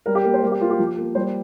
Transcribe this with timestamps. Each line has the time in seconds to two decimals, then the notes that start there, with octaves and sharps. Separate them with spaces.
0.06 G3 A#4
0.15 G4
0.24 A#3 A#4
0.34 C5
0.43 G3 A#4
0.52 G4
0.61 A#3 F4
0.70 G4
0.79 F3
0.98 A#3
1.15 G3 C5